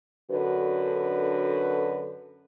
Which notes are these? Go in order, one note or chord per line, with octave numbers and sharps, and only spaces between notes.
F#2 D3 D4 F#4 A4 B4